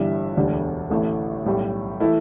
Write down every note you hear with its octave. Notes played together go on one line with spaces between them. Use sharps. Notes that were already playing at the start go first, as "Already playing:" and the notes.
Already playing: G1 G2 E3 G3 E5
E1 D2 D3 G3
A1 A2 E3 A3
B1 A2 G3
E3 A3 E4